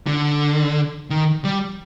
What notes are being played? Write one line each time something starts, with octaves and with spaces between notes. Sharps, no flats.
D3
D#3
G3